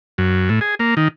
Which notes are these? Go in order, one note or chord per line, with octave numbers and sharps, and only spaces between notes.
F#2
A2
G#4
A#3
D#3